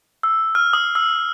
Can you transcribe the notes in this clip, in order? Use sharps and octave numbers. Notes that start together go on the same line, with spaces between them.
E6
F6
D#6
E6